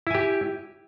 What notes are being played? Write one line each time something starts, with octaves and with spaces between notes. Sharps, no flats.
E4 G4 G#5